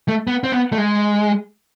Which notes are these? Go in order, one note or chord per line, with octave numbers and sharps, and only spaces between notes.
A3
B3
C4
B3
A3
G#3